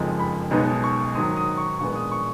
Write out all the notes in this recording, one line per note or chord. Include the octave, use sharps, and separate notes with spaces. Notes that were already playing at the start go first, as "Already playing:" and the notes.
Already playing: F#1 F2 F3 G#3 D#4
B5
B1 B2 G#3 B3 D#4
C#6
G#2 D#3 F#3 D#6
D#6
C#6
A#1 A#2 G#3 B3 C#6
D#6
C#6